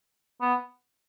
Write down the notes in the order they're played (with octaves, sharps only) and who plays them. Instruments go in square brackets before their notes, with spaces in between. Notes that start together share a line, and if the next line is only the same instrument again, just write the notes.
[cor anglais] B3